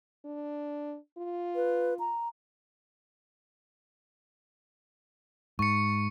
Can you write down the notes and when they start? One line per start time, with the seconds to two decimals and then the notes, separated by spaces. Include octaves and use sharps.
0.25 D4
1.18 F4
1.56 B4
1.99 A#5
5.59 G#2 C#6 C#7